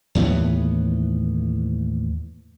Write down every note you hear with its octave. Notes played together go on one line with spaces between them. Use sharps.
D#2 A2 E3 B3